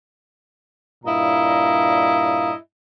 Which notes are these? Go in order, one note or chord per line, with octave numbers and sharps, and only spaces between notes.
G2 A#2 E4 D#5 F5 A#5